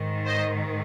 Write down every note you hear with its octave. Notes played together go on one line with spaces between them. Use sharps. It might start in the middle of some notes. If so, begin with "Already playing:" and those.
Already playing: G#2 D#3
C5 D#5